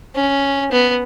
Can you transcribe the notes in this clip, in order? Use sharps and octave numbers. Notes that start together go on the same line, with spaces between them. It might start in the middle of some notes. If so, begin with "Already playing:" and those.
C#4
B3